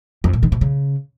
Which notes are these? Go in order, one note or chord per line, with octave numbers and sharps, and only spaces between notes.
F2
A#2
D#3
B2
C#3